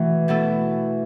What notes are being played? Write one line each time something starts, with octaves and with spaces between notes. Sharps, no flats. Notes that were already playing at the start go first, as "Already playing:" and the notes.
Already playing: B2 E3 A3 E4
B2 A3 E4 A4